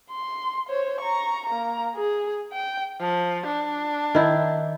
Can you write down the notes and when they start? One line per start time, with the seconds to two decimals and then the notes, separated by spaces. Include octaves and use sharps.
0.10 C6
0.70 C5 C#5
1.01 A#5 C#6
1.46 A#3 A#5
1.95 G#4
2.53 G5
3.00 F3
3.46 D4
4.15 D#3 E4